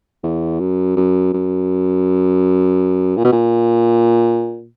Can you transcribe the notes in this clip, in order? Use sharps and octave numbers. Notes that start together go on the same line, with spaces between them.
E2
F#2
F#2
F#2
A#2
B2
A#2